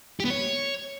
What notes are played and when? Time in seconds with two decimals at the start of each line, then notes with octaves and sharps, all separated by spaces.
0.20 G4
0.25 B3
0.30 C#5